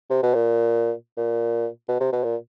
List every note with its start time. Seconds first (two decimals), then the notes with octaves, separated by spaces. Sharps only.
0.10 C3
0.23 B2
0.34 A#2
1.17 A#2
1.88 B2
2.00 C3
2.13 B2
2.24 A#2